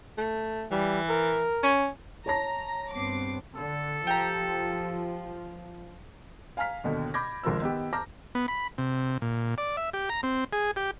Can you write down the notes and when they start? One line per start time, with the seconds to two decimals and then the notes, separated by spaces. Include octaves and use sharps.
0.18 A3
0.71 E3 G3
1.09 A#4
1.63 C#4
2.26 C#5 A5 A#5 A#6
2.91 G2 B3 C4 D6 C7
3.56 D3 A4
4.07 F3 G4 A#5
6.57 F5 G#5 A#5 F6 B6
6.84 D#2 B2 D3
7.14 B5 D6 G6 G#6 A#6
7.43 G#1 C#2 F3 A#4 E6
7.62 D#3 B3 G4
7.93 A5 A#5 D6 F6 G6 A#6
8.35 B3
8.48 B5
8.78 C3
9.22 A#2
9.58 D5
9.77 E5
9.94 G4
10.09 A#5
10.23 C4
10.53 G#4
10.76 G4